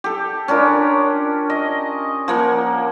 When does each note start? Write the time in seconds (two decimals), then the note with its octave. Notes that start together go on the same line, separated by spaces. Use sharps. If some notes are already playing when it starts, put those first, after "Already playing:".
0.04 G4 A4
0.48 C#4 D4 F4 A#4
1.50 D#5
2.28 F3 A#3 F#5